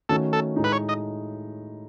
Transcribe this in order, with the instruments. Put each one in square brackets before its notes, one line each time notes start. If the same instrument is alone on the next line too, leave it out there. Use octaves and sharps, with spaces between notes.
[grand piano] D#3 A3 C#4 F#4 [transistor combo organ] A4
[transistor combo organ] A4
[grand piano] A2 G#3 D#4
[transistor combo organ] B4
C#5
D#5